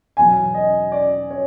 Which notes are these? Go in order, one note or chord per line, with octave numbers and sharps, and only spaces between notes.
E2 B2 F#3 G#5
D#5
D5
C#5